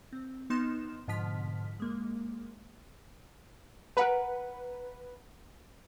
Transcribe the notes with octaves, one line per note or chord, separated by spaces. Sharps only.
C4
B3 D#4 C6 F6 E7
G#2 B2 D3 F3 F6 B6
G#3 A#3
A#4 B4 F#5 A#5